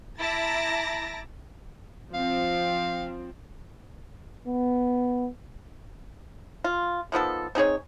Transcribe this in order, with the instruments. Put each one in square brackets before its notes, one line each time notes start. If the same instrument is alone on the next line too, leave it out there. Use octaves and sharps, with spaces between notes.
[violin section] E4 A5 A#5 D6 A6 A#6
[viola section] F3 C4 [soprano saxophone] F5
[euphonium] B3
[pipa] F4
D#3 F3 B3 A4
C4 D#4 G#4 C#5